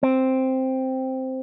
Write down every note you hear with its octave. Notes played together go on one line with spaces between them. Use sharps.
C4